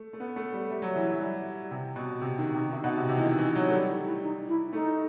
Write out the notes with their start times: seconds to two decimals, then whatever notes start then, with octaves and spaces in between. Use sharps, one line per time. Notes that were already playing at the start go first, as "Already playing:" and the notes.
Already playing: A3
0.13 A3
0.20 B3
0.36 A3
0.53 G3
0.70 G3 E5
0.82 F#3
0.96 E3
1.07 F#3
1.20 G3
1.71 C3
1.96 B2
2.21 C3
2.38 D#3
2.55 C3
2.71 D#3 E5
2.84 B2 F#5
2.97 C3 E5
3.09 C3 D#5
3.17 E3
3.22 D#3
3.39 E3
3.55 F#3
3.68 A3
3.72 G3 F#4
3.88 E4
4.05 E4
4.22 D#4
4.48 E4
4.73 A3 D#4